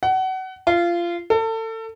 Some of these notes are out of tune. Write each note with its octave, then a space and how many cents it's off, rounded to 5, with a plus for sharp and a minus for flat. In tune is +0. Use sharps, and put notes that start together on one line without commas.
F#5 +30
F4 -20
A4 +30